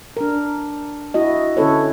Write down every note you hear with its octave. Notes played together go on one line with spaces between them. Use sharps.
D4 A#4
E4 F#4 D#5
D3 C#4 E4 A4 B4 C#5